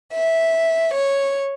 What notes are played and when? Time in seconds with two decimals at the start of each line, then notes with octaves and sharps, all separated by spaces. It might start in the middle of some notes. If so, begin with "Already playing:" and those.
0.13 E5
0.94 C#5